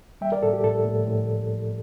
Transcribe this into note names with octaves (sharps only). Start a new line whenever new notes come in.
G3 E5 G5
A#4 D5
A2 A4
G4
A2 A4
A2
A2